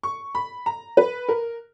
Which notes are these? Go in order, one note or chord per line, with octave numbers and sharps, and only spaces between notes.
C#6
B5
A#5
B4
A#4